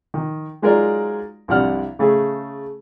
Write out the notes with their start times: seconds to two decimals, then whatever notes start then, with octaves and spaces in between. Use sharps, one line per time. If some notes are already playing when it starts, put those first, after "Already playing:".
0.14 D#3
0.62 F#3 G#3 D#4 F4 A#4 D5
1.48 C2 G2 C3 D5 F#5 F6
1.99 C#3 A3 G#4